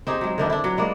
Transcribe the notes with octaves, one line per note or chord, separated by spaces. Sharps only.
C4 D#4 G4 G#4
F#3 G#3
D3 D#3 D4 E4
D4 E4
F#3
G3 G#3 A#3 D5